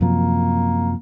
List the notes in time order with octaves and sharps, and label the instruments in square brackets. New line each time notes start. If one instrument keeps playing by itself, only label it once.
[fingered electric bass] F#2 C3 F3 [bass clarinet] A#3